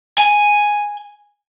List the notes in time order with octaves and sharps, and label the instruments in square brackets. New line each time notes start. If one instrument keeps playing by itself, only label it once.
[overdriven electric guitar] G#5